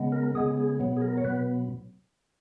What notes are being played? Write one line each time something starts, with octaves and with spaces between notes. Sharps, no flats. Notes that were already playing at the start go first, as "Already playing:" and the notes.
Already playing: C#3 G#3 B3
A#4
C#3 G#3 B3 G#4
G#4
B2 F#3 B3
G#4
A#4
C#5
B2 F#3 B3 B4